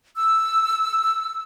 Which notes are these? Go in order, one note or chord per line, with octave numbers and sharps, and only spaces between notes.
E6